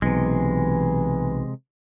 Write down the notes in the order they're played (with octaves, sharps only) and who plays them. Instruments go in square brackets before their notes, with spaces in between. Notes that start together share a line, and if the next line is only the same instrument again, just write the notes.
[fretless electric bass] B1 [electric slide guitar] C3 G#3 [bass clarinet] E3